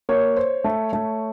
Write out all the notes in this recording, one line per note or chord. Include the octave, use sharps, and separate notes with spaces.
A#3 C#5
C5
A3
A3